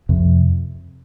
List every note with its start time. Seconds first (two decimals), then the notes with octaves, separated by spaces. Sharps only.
0.09 F2 C3